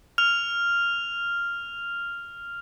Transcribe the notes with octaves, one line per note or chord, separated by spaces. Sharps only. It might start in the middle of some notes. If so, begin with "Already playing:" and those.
F6 F7